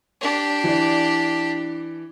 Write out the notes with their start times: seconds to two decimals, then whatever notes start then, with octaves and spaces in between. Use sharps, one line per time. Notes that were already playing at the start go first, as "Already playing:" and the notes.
0.21 D4 G4
0.64 E3 D5